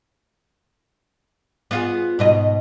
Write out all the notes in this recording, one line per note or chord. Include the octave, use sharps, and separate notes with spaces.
B3 F4 G#4
G#2 B2 D#5